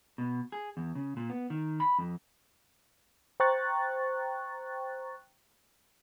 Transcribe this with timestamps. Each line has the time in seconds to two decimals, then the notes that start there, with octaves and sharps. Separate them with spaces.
0.18 B2
0.52 G#4
0.77 E2
0.95 C#3
1.17 A#2
1.30 B3
1.50 D#3
1.80 B5
1.99 F2
3.40 C5 G5 A#5 C#6 F#6 A6